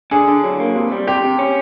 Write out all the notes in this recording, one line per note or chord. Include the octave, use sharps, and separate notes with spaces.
D3 G#4
D3
F#3
A#3
C3
G3
C3 G4
C3
C#4